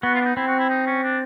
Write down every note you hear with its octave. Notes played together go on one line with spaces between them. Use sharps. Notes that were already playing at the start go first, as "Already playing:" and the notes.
B3 F#4
F4
D4
D#4
C4 E4
F#4
E4
D#4
C#4
D4